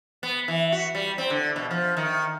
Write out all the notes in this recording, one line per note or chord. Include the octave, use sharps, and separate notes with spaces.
B3
E3
F#4
G3
C4
D3
B2
F3
D#3